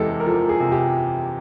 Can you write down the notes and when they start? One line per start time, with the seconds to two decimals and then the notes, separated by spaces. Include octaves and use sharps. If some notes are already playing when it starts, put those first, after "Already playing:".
Already playing: E2 C3 G#3 E4 G4 A4
0.20 A#4
0.26 F3 A4
0.49 G#4
0.60 C3
0.72 G4